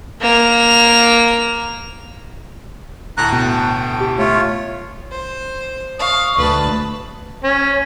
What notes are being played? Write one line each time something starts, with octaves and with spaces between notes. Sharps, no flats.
A#3 F7
D2 A2 A5 A#5 F#6
B2 G5
G4
A3 F4 C#5
C5
F5 C#6 D#6
D2 B4 A5
C#4